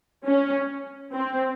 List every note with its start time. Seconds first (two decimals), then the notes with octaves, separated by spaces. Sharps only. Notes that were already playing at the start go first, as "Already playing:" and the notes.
0.26 C#4
1.12 C4